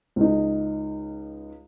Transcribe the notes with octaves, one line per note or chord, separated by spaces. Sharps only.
C#2 D#4